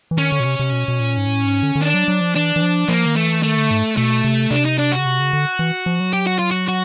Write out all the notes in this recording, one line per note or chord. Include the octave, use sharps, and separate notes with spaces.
E3
D#3 C#4
D3
B2
C3
C3
B2
B2
A#2
G#2
A2
G#2
D3
D3
D#3 D4
F#3
F#3
F3
E3 D4
E3
F3
F3 A#3
D#3
E3 A3
D#3 A3
D3
G#2
B2 A3
C3
C3 D4
D#4
D4
F#4
C#3
C3
C#3
D3
E3
F3
F#3
G4
F#4
F4
F#4
F#4